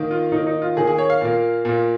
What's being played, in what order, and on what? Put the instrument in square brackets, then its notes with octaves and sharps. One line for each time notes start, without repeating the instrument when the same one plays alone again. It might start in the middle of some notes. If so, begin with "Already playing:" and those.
Already playing: [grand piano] D#3 A#3
F4
D#3 A#3 D#4
D#4
F4
D#3 A#3 G#4
G#4
C#5
F5
A#2 A#3
A#2 A#3